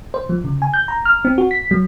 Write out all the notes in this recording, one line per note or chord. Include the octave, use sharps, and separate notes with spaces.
C5
F3
C#3
G#5
G6
A#5
F6
C4
F#4
B6
F#3